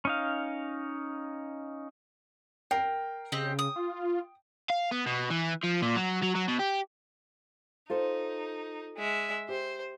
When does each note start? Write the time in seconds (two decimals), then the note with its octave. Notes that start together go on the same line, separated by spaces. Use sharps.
0.05 C#4 D#4 F5
2.71 A#4 G5 C7
3.32 C#3 C4 G4 D#5
3.59 D#6
3.76 F4
4.70 F5
4.91 B3
5.06 B2
5.30 E3
5.63 F3
5.82 A#2
5.96 F#3
6.23 F#3
6.36 F#3
6.48 B2
6.59 G4
7.90 D#4 F4 A4 C5
8.97 G#3 E5
9.49 G4 C5